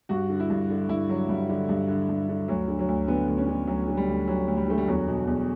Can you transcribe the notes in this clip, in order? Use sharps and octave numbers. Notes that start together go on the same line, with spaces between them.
G2 F#4
D3
E4
G2
D3
G2 E4
D3 F#3
G2 G3
D3
G2
D3
G2
D3
D2 F#3
D3
F#3
D2
D3 B3
D2
C#4
D3
D2 F#3
D3
G3
D2
D3 F#3
D2
G3
D3 A3
G3
E2 F#3
B2
E2